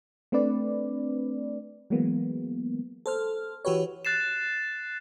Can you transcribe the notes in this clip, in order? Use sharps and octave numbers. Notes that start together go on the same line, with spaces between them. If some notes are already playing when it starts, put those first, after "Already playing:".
A3 C4 D4 B4 D5
E3 F#3 G#3 A#3 B3
A4 C5 F6
E3 F#4 G4 B4 C#5
F#6 A6 C7 E7